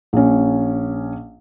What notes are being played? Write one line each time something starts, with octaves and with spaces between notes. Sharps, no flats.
A#1 C#4